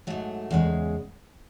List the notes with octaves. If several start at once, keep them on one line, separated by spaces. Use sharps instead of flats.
G#2 F#3 A3
E2 C#3 G#3